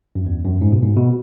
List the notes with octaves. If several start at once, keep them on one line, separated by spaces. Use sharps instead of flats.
F#2
E2
F#2
G#2
B2
G#2
B2